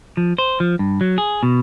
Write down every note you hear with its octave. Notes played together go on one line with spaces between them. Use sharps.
F3
C5
F3
G2
F#3
G#4
B2